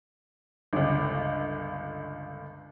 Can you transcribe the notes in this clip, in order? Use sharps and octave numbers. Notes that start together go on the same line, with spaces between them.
G1 C#2